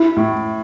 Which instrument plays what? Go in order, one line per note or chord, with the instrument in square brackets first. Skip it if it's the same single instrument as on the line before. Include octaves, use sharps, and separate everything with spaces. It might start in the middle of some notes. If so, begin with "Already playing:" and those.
Already playing: [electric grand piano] E4
[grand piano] A2